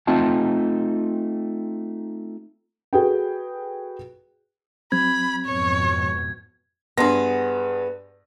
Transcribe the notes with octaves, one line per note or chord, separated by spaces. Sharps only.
A3 C4 D#4 F4 A5
F#4 G#4 A4 B4 G5
F#3 C4 B5 G#6
F2 G#2 B2 C#5
G2 B3 G#4 C6 A#6